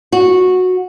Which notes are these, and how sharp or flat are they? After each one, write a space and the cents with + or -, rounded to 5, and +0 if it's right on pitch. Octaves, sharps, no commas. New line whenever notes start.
F#4 -10